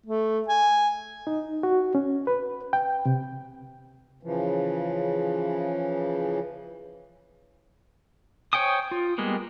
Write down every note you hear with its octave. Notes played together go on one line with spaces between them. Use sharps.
A3
G#5
D#4
F#4
C#4
B4
G5
C3
C#3 E3 F3
C5 C#5 G5 G#5 D#6
F4
G3 G#3 A#3 B3